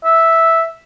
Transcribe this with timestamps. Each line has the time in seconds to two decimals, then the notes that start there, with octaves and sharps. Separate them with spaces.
0.05 E5